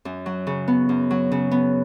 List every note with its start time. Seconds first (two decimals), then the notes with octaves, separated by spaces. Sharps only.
0.05 F#2
0.26 F#3
0.47 C#3
0.68 B3
0.89 F#2
1.11 F#3
1.32 C#3
1.51 B3